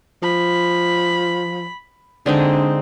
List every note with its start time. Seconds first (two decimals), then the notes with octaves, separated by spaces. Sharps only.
0.23 F3 B5
2.26 D3 G#3 C4 D4 D#4